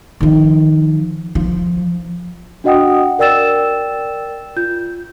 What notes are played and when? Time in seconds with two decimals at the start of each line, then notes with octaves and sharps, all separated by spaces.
0.21 D#3 F3
1.35 F3
2.64 D4 F#4 D#5 F#5 G5 D#6
3.19 A#4 D5 G5 E6 A6 E7
4.56 F4 G6